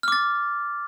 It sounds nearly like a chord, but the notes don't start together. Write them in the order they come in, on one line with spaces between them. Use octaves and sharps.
F6 D6 A6